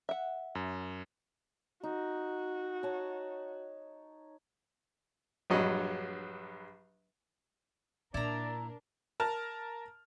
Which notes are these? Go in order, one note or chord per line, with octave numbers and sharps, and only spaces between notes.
E5 F#5
F#2
D#4 F#4
C#5 A5
A#1 G2 F#3 D#5
A#2 D4 E4 A#4 D5 A#5
A#4 A5 F6